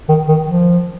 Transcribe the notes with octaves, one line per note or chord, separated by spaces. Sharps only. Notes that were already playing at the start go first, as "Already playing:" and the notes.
D#3
D#3
F3